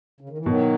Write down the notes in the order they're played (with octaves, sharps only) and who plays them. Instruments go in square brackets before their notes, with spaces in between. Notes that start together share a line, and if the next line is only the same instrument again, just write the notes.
[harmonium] C#3
D#3
E3
[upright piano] B2 [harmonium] D#3 F#3